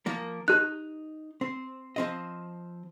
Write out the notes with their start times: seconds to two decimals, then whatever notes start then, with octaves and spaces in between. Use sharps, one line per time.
0.06 F3 A#3 A#4
0.48 D#4 G4 F#6
1.41 C4
1.96 F3 C4 D#5